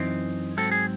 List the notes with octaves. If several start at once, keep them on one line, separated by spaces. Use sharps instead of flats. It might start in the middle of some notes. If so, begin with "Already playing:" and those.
Already playing: F#2 E3 C4 D#4
G#2 F#3 C4 A4
G#4